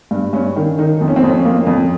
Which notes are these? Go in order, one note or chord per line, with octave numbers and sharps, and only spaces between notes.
G2
G2 C#4
D#3
D#3 D#4
F2
C#4
C4
F2 C#4
C#4
A#3
F2